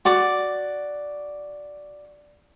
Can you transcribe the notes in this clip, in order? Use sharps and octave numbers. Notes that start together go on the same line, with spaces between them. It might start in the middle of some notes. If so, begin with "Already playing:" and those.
F#4 D5 D6